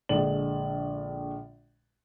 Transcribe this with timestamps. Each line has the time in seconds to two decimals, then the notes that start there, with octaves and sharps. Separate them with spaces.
0.09 A#1 D3 G#3 D5 F#7